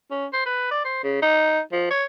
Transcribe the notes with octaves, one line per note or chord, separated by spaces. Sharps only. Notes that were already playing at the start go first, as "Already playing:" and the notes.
C#4
C5
B4
D5
C5
C#3
D#4
F3
C#5